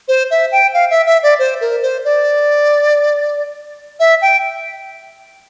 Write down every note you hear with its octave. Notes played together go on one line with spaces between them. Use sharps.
C5
E5
G5
F5
E5
E5
D5
C5
A#4
C5
D5
E5
G5